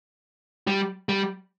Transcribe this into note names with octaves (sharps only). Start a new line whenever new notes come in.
G3
G3